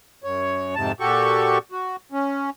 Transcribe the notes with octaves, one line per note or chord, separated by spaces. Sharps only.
F#2 C#5
F2 G#2 C3 A5
A#2 F#4 G4 A4 C#6
F#4
C#4